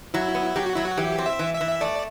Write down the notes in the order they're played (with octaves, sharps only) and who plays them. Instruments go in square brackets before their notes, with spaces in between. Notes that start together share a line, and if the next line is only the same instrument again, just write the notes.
[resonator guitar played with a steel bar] F#3 [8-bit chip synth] E4
[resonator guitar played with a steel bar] B3
[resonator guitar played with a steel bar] F#3 [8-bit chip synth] G4
[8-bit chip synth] F#4
[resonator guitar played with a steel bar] F#3 [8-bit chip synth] E4
[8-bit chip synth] F#4
[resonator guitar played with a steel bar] E3 [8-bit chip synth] G4
[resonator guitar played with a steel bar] C4
[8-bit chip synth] E5
[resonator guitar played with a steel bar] E3
[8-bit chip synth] E5
[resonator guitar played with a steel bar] E3
[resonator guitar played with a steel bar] A3 [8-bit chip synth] D5